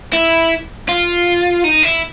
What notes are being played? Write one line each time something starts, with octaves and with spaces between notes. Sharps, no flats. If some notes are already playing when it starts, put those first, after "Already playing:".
E4
F4
D#4
E4